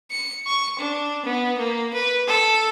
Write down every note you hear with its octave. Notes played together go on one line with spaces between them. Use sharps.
C#7
C#6
D4
B3
A#3
B4
A4